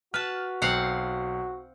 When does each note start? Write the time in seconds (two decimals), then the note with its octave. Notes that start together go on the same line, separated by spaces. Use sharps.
0.14 F#4 B4 A5 F6
0.62 B1 C4 F5 F#5 C7